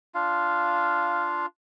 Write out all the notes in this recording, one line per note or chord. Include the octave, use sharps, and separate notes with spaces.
D4 F4 F5